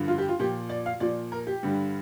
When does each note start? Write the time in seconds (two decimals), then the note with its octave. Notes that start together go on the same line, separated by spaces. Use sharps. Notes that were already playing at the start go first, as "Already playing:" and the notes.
Already playing: G2 D3 F3
0.08 F4
0.18 G4
0.29 F4
0.39 A#2 F3 G4
0.69 D5
0.86 F5
1.00 A#2 F3 D5
1.32 A#4
1.47 G4
1.63 G2 D3 G3